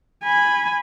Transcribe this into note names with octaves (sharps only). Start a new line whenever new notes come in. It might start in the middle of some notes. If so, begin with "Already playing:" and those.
G#5 B5